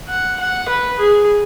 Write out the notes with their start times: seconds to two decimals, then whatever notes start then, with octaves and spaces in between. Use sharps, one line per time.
0.09 F#5
0.40 F#5
0.69 B4
0.99 G#4